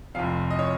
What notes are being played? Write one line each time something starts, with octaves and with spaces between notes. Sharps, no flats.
F1 F2 C3 F5
D#5
C#5